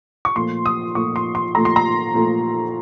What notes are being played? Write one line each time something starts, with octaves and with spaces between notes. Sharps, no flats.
C#6
A#2 F3 A3 C6
D#6
A#2 F3 A3 C#6
C6
C6
A#2 F3 A3 A#5
C6
A#5
A#2 F3 A3